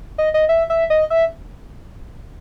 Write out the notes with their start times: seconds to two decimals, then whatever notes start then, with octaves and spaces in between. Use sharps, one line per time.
0.18 D#5
0.34 D#5
0.49 E5
0.70 E5
0.90 D#5
1.10 E5